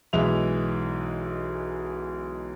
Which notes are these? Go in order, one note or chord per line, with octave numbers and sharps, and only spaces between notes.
B1 E3 G#3 E5 F7